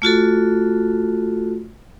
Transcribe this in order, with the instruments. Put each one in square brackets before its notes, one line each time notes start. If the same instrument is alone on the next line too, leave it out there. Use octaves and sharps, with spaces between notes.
[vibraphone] A3 F4 F#4 A4